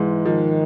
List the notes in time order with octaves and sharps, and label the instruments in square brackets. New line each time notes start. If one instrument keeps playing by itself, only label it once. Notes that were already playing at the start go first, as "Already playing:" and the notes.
Already playing: [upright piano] G#2 G#3 [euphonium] E3
[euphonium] D#3 [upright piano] F3